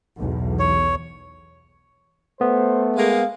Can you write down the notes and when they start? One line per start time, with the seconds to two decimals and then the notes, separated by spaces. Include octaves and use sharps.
0.19 B1 E2 B2
0.59 C#5
2.41 A3 B3 C5
2.97 G#3 A#3 G#4 F5